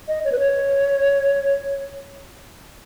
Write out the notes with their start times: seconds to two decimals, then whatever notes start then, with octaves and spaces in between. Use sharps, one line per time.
0.08 D#5
0.25 C#5
0.32 B4
0.39 C#5